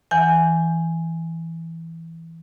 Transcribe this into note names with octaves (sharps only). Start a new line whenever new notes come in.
E3 F#5 G#5